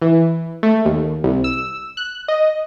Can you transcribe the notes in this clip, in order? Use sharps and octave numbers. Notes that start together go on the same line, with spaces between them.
E3
A3
D#2
C2
E6
F#6
D#5